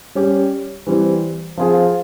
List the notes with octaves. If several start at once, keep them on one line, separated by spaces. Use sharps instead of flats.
G3 C#4 G4
E3 G3 C4
F3 C4 F4 G#4